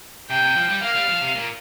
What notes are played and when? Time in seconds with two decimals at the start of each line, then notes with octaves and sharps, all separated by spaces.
0.29 C3 G5
0.43 C3
0.56 F3
0.69 G3
0.82 A#3 F5
0.95 G3
1.08 F3
1.21 C3
1.35 A#2